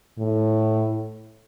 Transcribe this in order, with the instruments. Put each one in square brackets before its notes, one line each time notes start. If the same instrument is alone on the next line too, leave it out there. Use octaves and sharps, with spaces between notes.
[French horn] A2